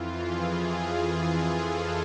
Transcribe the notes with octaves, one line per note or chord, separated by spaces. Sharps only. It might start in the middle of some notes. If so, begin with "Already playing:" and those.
Already playing: F2 E3 F4
G#4
G#4
A4